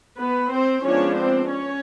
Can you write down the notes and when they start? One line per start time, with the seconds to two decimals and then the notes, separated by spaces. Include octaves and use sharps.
0.19 B3 B4
0.51 C4 C5
0.84 F3 G#3 B3 C#4 D4 C#5
1.17 C4 C5
1.49 C#4 C#5